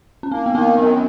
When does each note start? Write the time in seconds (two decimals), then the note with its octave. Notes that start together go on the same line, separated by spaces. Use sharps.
0.23 C#4
0.32 A#3 C4
0.46 B3
0.55 D#3 C4
0.78 F#2 B3